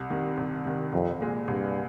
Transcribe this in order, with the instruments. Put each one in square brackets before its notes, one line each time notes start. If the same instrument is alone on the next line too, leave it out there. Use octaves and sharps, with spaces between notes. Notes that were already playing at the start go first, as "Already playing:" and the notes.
Already playing: [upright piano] C2
C3 D#3
C2
C3 D#3
[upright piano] C2 [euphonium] F2
[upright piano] A#2 G#3
[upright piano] C2 [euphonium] G2